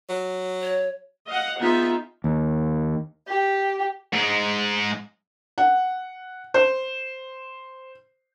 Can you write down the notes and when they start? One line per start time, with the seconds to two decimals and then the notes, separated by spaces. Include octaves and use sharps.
0.09 F#3
0.62 C#5
1.27 D#5 F5 F#5
1.59 B3 D#4 F4 G#4 E5
2.24 D#2
3.27 G4
4.13 G#2 G#3
5.58 F#5
6.54 C5